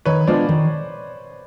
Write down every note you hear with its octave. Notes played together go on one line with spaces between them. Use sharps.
D#3 B4 C#5
G#3 B3 D4 F4 C5 D5
D#3